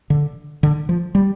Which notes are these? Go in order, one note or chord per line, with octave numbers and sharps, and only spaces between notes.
D3
D3
F3
G3